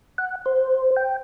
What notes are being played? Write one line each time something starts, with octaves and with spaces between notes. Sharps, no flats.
F#5
C5
G5